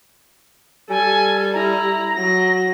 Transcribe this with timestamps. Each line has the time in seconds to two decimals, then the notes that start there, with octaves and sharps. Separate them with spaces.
0.90 G3 A4 G#5
1.54 E4 A#5
2.15 F#3 A#6